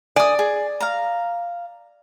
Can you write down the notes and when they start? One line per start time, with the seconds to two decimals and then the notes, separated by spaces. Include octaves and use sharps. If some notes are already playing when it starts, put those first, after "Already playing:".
0.16 D5 G#5 D#6
0.39 G#4
0.80 F5 A#5